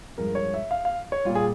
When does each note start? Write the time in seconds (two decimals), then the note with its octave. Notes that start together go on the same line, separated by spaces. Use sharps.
0.18 G2 F3 G#3 A#4
0.35 C#5
0.54 E5
0.71 F5
0.85 F5
1.12 C#5
1.25 A#2 G3 F4
1.35 G#4